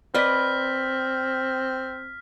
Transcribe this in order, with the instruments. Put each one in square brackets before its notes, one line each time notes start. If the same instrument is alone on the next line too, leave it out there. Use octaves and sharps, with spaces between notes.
[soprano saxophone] C4 [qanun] B4 D5 D#5 [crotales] F6 B6